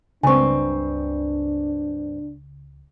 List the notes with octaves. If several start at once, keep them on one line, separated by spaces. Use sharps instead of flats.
C#2 G2 C4 D4 G#5 C#6